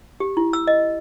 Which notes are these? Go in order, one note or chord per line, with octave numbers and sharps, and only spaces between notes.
G4
E4
E6
D#5